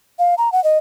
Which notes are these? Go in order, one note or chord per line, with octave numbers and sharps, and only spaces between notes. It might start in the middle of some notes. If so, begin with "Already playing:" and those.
F5
A#5
F#5
D#5